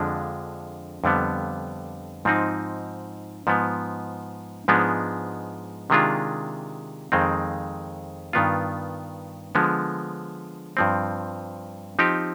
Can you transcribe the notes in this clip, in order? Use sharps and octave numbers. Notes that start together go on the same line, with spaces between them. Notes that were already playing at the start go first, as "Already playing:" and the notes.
Already playing: F2 D3 F3 G#3 D4
F2 D3 G3 B3
G#2 F3 C4 D#4
G#2 F3 B3
G#2 F3 G#3 B3 D4
C3 D#3 G#3 D4 F4
F2 D#3 G#3 C4
G2 D#3 B3 F4
D3 F3 G#3 B3
G2 F3 C4
F3 C4 D#4 G4